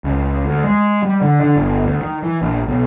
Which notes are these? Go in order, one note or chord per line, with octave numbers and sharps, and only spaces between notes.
C#2
D2
G#3
G3
D3
D3
G1
D2
D#3
E3
A#1
B1